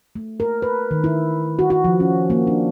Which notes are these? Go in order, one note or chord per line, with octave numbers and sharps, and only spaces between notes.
A3
A#4
B4
D#3
E4
F#4
F#4
F3
C#4
A#3
D4